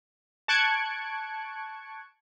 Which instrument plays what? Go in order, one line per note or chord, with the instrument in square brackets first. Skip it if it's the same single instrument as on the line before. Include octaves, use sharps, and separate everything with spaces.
[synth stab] A5 C#6 F#6 G#6 C#7 D7